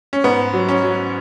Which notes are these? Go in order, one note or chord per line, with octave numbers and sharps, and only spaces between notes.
C#4
G#2 B3
F#3
C#4
F#3